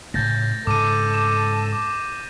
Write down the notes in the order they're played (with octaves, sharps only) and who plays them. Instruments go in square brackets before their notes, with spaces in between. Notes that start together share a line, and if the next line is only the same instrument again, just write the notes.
[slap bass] A2 C#3 A3 [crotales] G6 A6 A#6
[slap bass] G#2 C#3 [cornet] A4 [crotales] D6 D#7
[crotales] D6 E7
D6